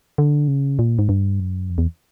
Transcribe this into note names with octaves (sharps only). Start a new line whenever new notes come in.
D3
C#3
A#2
G#2
G2
F#2
F2
E2